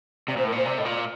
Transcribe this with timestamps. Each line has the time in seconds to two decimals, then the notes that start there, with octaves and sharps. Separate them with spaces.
0.28 C3 D5
0.37 A#2 C5
0.44 A2 A#4
0.52 A#2 C5
0.65 C3 D5
0.78 A2 D#5
0.85 A#2
0.90 D5